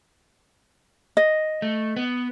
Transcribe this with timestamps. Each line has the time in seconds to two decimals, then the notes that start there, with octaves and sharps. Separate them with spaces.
1.17 D#5
1.62 A3
1.97 B3